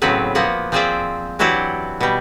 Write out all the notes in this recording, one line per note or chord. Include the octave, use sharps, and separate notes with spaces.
A2 C#3 F#3 B3 C4 B4
F3 A#3 B3 F#5
F3 C4 G#4 C5 D5 E5
E3 F#3 D4 E4 F#4 G4
B2 G3